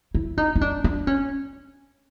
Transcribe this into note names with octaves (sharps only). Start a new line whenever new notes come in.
E4
D#4
D#4
D4
D4
C#4